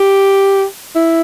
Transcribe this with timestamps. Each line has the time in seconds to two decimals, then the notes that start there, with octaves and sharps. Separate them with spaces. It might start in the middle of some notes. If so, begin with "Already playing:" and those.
Already playing: G4
0.96 E4